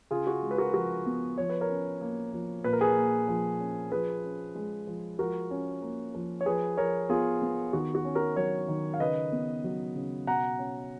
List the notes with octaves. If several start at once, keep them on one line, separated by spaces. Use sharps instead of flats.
C#3 F4 G#4
F#4
G#3
B4
F#4 A#4
F3 F#4 A#4
B3
F3 C#5
B4
A#4 C#5
C#4
A#3
F3
A#2 B4
A#4
G#4 B4
A#3
F3
C#4
F3 G#4 B4
C#4
G#3
F3
F3 F#4 A#4
C#4
A#3
F3
C#5
F3 G#4 B4
F3 A#4 C#5
B3 F4 G#4
B3
D#3 F#4
F#4
C#4
F#4 A#4
F#3 A#4 C#5
D#3
F5
C#3 B4 D#5
B3
F#3
C#3
B2 F#5 A#5
C#4